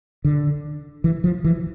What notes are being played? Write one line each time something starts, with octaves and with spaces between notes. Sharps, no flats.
D3
E3
F3
E3